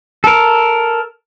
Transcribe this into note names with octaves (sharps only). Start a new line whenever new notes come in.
A4 A#4